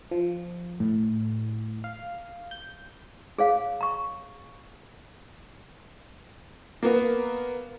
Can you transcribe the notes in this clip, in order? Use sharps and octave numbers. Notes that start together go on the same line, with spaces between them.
F3
A2
F5
G6
G#4 C#5 F5
A#5 C#6
A#3 B3